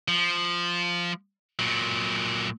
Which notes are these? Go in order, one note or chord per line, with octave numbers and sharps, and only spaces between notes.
F3
A#2 F#3